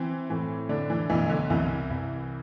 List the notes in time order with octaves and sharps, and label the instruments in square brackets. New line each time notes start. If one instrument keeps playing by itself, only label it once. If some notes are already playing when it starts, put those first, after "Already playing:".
Already playing: [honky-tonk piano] E3 [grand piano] C4
[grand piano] A2 [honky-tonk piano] E3
[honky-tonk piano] D3 [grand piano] D4
[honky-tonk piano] E3
[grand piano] B1 [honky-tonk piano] E3
[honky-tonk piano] D3
[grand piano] C2 [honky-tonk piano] E3
[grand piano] C2